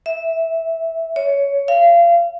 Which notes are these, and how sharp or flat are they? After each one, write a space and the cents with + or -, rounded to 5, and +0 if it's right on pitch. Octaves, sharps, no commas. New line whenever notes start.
E5 -10
C#5 +15
F5 -30